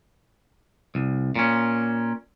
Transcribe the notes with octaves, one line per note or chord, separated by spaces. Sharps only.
C2
A#2 C#4